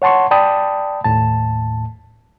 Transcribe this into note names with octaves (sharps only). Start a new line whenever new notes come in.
C#5 F#5 A5 C6 C#6
D5 G5 A5 B5 D#6
D#2 A2 A5